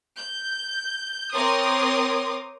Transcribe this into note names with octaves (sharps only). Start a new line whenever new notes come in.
G6
C4 A#4 C#5 C6 D6 D#6